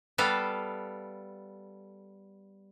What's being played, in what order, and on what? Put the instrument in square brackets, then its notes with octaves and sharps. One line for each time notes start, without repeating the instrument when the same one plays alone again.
[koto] G3 B3 A4 F5